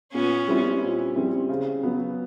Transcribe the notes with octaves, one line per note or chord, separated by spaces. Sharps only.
A#2 B3 C#4
G3 C4 E4
A#2
G3 C4 E4
C#3
F#3 B3